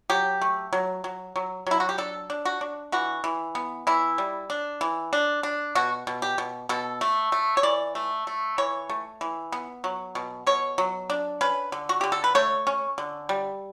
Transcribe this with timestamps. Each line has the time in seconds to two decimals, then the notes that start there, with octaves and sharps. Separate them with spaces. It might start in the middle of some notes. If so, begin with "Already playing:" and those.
0.10 F#3 G4
0.42 A3
0.73 F#3
1.04 F#3
1.36 F#3
1.67 F#3 E4
1.80 F#4
1.89 G4
1.98 D4 A4
2.30 D4
2.45 F#4
2.61 D4
2.92 E3 F#4
3.24 E3
3.55 B3
3.87 E3 E4
4.18 G3
4.50 D4
4.81 E3
5.13 D4
5.43 D4
5.75 B2 F#4
6.07 B2
6.22 G4
6.38 B2
6.69 B2 A4
7.01 A3
7.32 A3
7.57 C#5
7.63 E3 D5
7.95 A3
8.27 A3
8.58 E3 C#5
8.89 A3
9.21 E3
9.52 B3
9.84 F#3
10.15 B2
10.46 B2 C#5
10.78 F#3
11.10 D4
11.41 C#4 B4
11.72 D3
11.89 F#4
12.01 D3 G4
12.12 A4
12.24 B4
12.35 A3 C#5
12.67 C#4
12.98 D3
13.29 G3